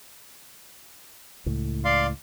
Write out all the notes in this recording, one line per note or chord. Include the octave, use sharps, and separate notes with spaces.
C#2 A2
D5 F5 C6